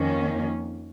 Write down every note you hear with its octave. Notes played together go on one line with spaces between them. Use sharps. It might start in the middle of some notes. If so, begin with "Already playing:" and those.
Already playing: F2 D#3 A#3 C#4